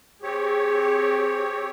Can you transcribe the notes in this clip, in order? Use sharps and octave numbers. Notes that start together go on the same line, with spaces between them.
C4 G4 G#4 C#5